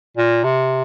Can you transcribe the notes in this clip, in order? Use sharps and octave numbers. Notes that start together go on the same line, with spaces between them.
A#2
C3